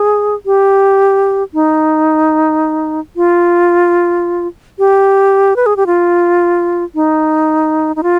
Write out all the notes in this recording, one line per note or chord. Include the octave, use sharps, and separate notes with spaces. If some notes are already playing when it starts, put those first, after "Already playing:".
Already playing: G#4
G4
D#4
F4
G4
B4
G#4
G4
F4
D#4
D#4
F4